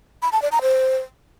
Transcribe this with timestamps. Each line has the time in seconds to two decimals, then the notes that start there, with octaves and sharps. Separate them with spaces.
0.22 B5
0.32 A5
0.42 D5
0.52 A#5
0.62 C5